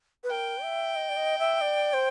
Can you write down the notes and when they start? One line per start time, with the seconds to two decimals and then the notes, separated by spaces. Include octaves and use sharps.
0.24 B4
0.30 A#4 G5
0.63 E5
0.96 D#5
1.09 D5
1.17 D#5
1.39 E5
1.61 D5
1.93 C5